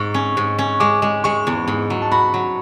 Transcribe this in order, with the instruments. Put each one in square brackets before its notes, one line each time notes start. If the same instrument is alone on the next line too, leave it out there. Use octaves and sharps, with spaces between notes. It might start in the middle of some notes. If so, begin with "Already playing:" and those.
Already playing: [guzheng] G#2 [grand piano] C#6
[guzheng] C#4
G#2
C#4
[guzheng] G#3 [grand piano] D6
[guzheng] G#3
[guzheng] G#3 [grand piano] C#6
[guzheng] E2
G#2
F#3
[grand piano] A5
[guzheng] F#4 [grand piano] B5
[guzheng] F#3